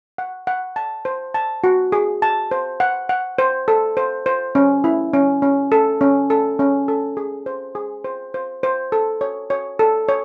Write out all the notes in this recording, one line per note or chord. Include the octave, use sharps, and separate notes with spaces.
F#5
F#5
A5
C5
A5
F#4
G#4
A5
C5
F#5
F#5
C5
A4
C5
C5
C#4
E4
C#4
C#4
A4
C#4
A4
C#4
A4
G#4
C5
G#4
C5
C5
C5
A4
C#5
C#5
A4
C#5